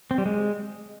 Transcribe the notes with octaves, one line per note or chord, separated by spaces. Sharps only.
C4
G3
G#3